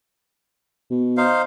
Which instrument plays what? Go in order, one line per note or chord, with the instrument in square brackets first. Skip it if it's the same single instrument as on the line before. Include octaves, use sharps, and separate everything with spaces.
[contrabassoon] B2
[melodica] D#4 C5 F5